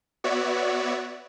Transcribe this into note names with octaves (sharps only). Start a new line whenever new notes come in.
B3 F#4 C#5 D5 E5